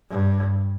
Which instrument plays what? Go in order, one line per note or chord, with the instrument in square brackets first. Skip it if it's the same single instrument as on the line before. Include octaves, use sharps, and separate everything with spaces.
[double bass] G2